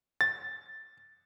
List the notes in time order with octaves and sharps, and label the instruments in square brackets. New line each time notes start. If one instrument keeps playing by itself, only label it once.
[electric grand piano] A6